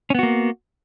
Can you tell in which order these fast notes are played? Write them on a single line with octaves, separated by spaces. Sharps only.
C#4 B3 F#4 A#3